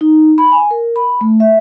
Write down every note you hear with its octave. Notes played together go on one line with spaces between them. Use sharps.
D#4
B5
G#5
A#4
B5
A3
E5